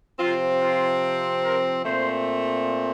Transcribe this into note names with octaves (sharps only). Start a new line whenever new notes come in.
C3 F3 C4 F4
F4
A#4
A#2 A3 C4 C5